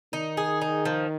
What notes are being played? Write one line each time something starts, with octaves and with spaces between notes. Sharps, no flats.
D#3 D#4
G#4
D#4
F3